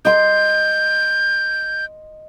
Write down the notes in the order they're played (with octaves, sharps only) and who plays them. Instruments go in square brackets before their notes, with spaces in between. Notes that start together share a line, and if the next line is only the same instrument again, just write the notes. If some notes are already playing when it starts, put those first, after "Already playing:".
[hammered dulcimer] D#5 C6 [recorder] G6